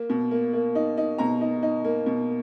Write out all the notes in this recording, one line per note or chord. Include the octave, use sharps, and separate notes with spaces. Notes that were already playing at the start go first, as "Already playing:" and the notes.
Already playing: A#3
B2
A#3
A#3
D#4
D#4
B2 A#5
D#4
D#4
A#3
B2